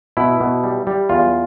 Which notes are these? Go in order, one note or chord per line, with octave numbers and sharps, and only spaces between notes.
B2 E4
B2
G3
G3
E2 F4